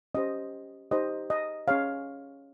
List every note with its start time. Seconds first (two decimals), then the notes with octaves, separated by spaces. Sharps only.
0.15 C#4 G4 C5 D#5
0.91 D#4 G4 C5 D#5
1.30 D#5
1.68 C#4 G#4 C#5 F5